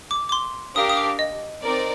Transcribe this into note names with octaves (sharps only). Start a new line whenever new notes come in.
D6
D6
C6
D4 G4 A#4 F5 D#6
D#6
D6
D#5
C4 D#4 A#4 D5